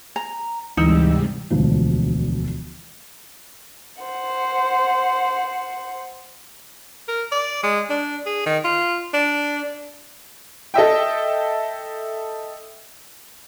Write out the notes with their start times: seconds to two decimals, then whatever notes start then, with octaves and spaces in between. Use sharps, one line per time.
0.16 A#5
0.77 D2 G#2 C3 E3 G3 D#4 E6
1.50 E1 D2 F3 F4
4.02 C5 F#5
7.08 A#4
7.32 D5
7.63 G#3
7.90 D4
8.26 G#4
8.46 D#3
8.64 F4
9.14 D4
10.74 A4 D#5 E5 G5